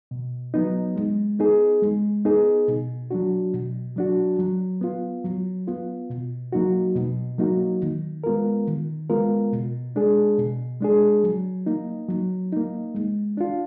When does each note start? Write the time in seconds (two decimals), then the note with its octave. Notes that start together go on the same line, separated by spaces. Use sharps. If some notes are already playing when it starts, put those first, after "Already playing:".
0.11 B2
0.54 F#3 B3 D#4
0.96 G#3
1.39 B3 D#4 G#4
1.82 G#3
2.25 B3 D#4 G#4
2.68 B2
3.11 F#3 D4 F#4
3.53 B2
3.96 F#3 D4 F#4
4.39 F#3
4.81 B3 F4
5.24 F#3
5.67 B3 F4
6.10 B2
6.52 F#3 A#3 D#4 F#4
6.95 B2
7.38 F#3 A#3 D#4 F#4
7.82 D#3
8.24 G#3 B3 F4 A#4
8.67 D#3
9.10 G#3 B3 F4 A#4
9.53 B2
9.95 G#3 D4 G#4
10.38 B2
10.80 G#3 D4 G#4
11.24 F#3
11.66 A#3 D#4
12.09 F#3
12.52 A#3 D#4
12.95 G#3
13.37 D4 F4